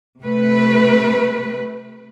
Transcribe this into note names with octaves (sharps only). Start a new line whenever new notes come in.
C3 A3 B4